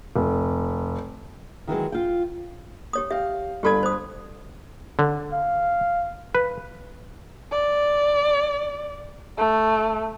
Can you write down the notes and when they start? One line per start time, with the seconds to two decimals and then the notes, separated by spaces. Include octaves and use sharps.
0.16 F1
1.67 D#3 E3 F#3 G#3
1.92 F4 G5
2.93 G4 C#5 D#6
3.11 G4 E5 F5
3.63 G1 G4 A4 A5 B5 G#6
3.83 C5 D#6
4.99 D3
5.33 F5
6.35 B4
7.52 D5
9.37 A3